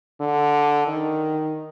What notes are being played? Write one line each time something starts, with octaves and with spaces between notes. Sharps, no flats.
D3
D#3